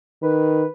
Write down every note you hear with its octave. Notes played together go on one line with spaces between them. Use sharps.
D#3 B4